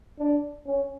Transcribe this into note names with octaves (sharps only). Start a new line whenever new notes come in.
D4
C#4